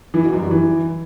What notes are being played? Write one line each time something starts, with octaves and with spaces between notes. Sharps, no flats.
E3
B2
F#2
G3
E3